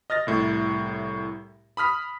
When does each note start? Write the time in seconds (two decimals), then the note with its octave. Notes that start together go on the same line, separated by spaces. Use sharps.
0.10 D#5 F6 A6 A#6
0.27 C2 A2
1.77 B5 D#6 F6 B6